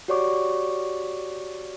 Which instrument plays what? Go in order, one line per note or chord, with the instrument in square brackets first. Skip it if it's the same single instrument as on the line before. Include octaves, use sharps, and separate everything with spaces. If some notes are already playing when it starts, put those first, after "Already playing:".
[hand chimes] F#4 G4 C#5 D5 C#6 D6